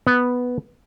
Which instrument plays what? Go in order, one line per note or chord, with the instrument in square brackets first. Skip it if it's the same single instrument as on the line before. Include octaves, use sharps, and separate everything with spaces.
[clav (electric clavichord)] B3